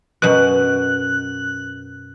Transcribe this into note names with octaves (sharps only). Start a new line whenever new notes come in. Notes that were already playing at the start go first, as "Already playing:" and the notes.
F#2 B2 F#6